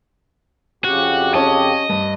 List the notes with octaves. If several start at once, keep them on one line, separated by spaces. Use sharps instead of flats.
F2 C#3 F#4 G4
C#4 D#5 A5
G2